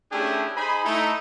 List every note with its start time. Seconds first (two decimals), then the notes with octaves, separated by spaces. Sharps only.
0.12 A3 C#4 D4 E4 G4 G#4
0.55 D#4 G#4 C5 G#5 B5
0.84 A3 D#4 E4